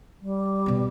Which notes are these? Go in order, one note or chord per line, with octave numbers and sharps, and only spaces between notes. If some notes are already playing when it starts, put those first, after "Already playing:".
G3
B2 B3